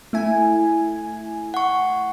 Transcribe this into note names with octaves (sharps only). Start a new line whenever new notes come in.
A3 E4 G#5
F#5 C#6